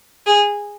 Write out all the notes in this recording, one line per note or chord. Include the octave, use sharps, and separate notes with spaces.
G#4